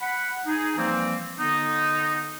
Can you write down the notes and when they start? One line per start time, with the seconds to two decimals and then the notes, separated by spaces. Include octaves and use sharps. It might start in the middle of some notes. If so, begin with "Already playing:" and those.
0.01 F#5 B5
0.46 D#4 G#4
0.76 E3 F3 G3 A#3 C4
1.38 D3 B3 D#4